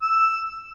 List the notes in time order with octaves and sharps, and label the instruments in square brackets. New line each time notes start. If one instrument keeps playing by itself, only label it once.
[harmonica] E6